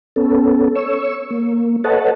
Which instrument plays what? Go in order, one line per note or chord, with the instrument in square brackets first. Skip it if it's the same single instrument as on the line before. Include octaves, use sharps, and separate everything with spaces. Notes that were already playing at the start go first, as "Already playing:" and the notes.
[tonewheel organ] B3 C#4 A4
C#5 C#6 E6
A#3
A4 B4 C#5 D#5 F#5 A5